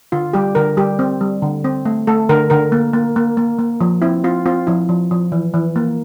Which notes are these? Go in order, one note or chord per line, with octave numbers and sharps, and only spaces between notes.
D3 F4
G3 G4
D3 A#4
G3 G4
C4
G3
D3
C4
A3
A3 A4
D3 A#4
D3 A#4
A#3
A#3
A#3
A#3
A#3
F3
C4 E4
C4 F4
C4 F4
F3 E4
F3
F3
E3
E3
A#3